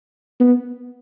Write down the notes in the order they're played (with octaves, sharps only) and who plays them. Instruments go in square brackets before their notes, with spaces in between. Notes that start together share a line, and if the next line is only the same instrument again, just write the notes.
[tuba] B3